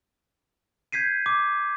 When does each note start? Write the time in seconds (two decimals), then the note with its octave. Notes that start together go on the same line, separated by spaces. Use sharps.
0.92 G6 G#6 B6 C7 D#7
1.26 D6